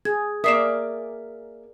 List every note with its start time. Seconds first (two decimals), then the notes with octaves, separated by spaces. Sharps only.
0.05 G#4 G#6
0.44 A#3 A#4 D5 E5 D#6 C7 E7